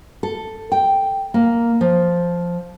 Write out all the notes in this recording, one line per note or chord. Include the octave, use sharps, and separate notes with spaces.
A4
G5
A#3
F3